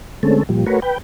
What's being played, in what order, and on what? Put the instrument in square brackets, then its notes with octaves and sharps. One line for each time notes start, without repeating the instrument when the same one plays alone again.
[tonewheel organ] D3 G#3 A3 C4 C#4 A4
A#2 F3 G3
A3 F#4 A#4 B4 C#5
B4 G5